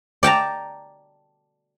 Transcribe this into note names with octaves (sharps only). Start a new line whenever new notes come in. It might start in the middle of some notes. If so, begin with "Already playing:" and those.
D5 G5 A5 A#5